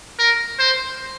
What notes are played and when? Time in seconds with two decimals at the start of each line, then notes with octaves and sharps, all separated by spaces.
0.19 A#4
0.59 C5